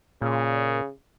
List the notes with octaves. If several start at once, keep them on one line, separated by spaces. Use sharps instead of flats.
A#2 C#3